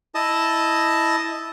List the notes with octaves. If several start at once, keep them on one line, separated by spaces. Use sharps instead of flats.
E4 D#5 A5 D#6